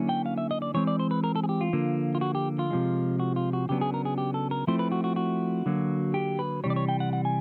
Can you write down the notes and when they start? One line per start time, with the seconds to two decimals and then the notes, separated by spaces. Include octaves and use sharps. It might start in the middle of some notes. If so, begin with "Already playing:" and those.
Already playing: D3 F#3 A#3 C#4 E4
0.09 G5
0.26 F5
0.38 E5
0.51 D#5
0.62 D5
0.74 E3 G#3 C4 C#5
0.87 D5
0.99 C5
1.11 B4
1.24 A#4
1.36 A4
1.44 G#4
1.49 G4
1.61 F4
1.73 D3 F3 A#3
2.15 F4
2.21 F#4
2.35 G4
2.59 F4
2.70 C3 F3 G#3
3.20 F#4
3.36 F4
3.53 F#4
3.69 C#3 F#3 B3 D4 G4
3.81 G#4
3.94 A#4
4.05 G#4
4.18 G4
4.34 A4
4.51 A#4
4.67 F3 A3 C4 E4 C5
4.79 B4
4.92 F#4
5.04 F#4
5.16 F#4
5.66 D3 F#3 A#3
6.14 G4
6.39 B4
6.64 C3 E3 G3 C#5
6.70 D5
6.76 C#5
6.89 G5
7.00 F#5
7.13 F#5
7.25 G#5